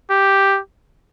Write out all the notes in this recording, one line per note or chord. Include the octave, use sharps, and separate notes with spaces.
G4